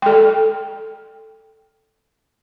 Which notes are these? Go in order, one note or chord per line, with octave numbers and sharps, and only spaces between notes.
A4 G5